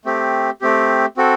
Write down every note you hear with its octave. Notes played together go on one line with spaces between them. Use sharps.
A3 C4 G4
A3 C4 G4
C4 F#4 A4